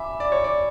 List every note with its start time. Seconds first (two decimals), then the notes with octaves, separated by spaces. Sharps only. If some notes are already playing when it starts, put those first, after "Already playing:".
Already playing: E5 G#5 B5 D6
0.20 D5
0.32 C#5
0.44 D5